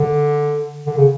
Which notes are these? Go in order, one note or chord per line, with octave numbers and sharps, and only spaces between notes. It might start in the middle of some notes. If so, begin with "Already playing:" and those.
Already playing: D3
D3
C#3